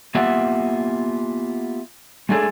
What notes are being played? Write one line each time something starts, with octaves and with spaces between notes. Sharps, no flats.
A#3 B3 F4 G4 E5 F#5
G#3 A3 D4 G#4 A4